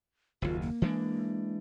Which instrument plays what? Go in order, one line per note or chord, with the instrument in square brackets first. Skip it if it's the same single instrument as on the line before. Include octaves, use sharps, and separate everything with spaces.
[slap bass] F#1 D#2 [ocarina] F4
[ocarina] A#3
[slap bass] E3 G#3 D4